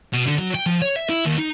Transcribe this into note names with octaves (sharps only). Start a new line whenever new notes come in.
B2
D3
F#3
G5
F3
C#5
E5
E4
D#2
D#4